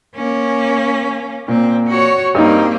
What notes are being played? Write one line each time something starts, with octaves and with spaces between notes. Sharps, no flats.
A#3 C#4
A#2 C4
F#4 C#5
G2 A#3 C4 D#4